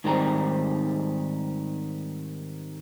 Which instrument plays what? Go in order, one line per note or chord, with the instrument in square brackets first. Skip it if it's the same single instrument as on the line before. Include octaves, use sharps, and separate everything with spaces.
[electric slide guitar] G#2 D#3 G3 C4 A4 A#5